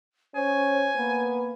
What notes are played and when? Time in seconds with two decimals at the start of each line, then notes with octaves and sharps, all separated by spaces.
0.35 C#4 C5 G#5
0.96 A#3 B3